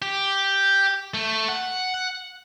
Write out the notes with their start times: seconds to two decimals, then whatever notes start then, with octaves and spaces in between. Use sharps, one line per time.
0.02 G4
1.14 A3
1.48 F#5